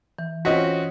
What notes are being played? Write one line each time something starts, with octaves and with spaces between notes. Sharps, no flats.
E3
C4 C#4 F4 F#4 D#5 B6